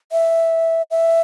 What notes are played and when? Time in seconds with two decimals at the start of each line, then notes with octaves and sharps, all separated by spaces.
0.12 E5
0.91 E5